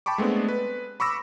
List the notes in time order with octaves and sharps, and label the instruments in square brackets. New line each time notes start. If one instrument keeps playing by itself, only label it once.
[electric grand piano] G5 A5 B5 C#6 D6
G#3 A3 B3 C4 D4
B4
B5 C#6 D6 E6 A#6